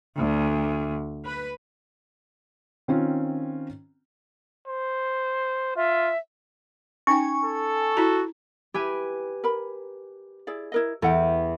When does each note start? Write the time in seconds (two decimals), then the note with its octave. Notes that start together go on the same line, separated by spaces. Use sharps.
0.16 D2
1.23 B4
2.88 D#3 C4 C#4 F4
4.68 C5
5.76 F4 E5
7.07 C#4 D#4 G5 G#5 C#6
7.45 A4
7.97 E4 F#4 A#5
8.74 E4 G4 B4 G#5
9.44 A#4 B5
10.47 E4 G#4 D5
10.72 E4 A#4 D#5
11.02 E2 A4 F#5 G5